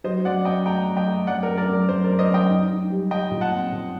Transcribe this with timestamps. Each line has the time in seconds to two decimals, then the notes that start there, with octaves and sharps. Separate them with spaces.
0.04 F#3 C5 D#5
0.25 F#2 D5 F#5
0.45 F#2 D#5 G5
0.66 A3 G5 A#5
0.87 F#2
0.97 D#5 G5
1.07 A3
1.27 F#2 D5 F#5
1.43 A#4
1.47 F#2
1.57 A#4 D5
1.68 F#2
1.73 A#4
1.88 F#2 C5
2.04 A#4 D5
2.08 F#2
2.19 C5 D#5
2.30 F#2 D#5 G5
2.49 D#4
2.71 D#4
2.91 G3
3.11 G3 D#5 G5
3.31 A#2
3.41 F#5 A5
3.51 C4
3.73 A#2